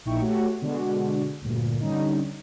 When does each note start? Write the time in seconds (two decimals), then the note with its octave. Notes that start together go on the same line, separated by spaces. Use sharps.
0.05 A#1 A#2 D#4 E4 G5 C#6
0.22 A3 F#4 G4 C#5 F#5
0.61 B2 D3 G#3 D4 F#4
1.41 D2 G2 A#2
1.80 D3 G3 C#4 D#4